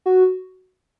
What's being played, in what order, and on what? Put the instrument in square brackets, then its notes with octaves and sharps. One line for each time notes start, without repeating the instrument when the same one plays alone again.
[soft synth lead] F#4